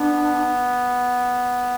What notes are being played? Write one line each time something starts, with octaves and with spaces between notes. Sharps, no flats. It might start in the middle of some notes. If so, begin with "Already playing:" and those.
Already playing: B3 D4